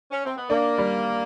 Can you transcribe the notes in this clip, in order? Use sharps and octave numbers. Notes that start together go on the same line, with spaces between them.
C#4
C4
B3
A#3 D4
G3